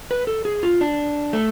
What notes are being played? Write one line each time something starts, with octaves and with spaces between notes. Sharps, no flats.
B4
A4
G#4
F4
D4
A3